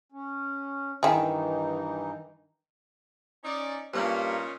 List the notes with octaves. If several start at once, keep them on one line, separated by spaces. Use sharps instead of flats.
C#4
G2 D#3 E3 D#4 E4 G#4
C#4 D#4 D5
G2 A#2 A#3 C#4 D#4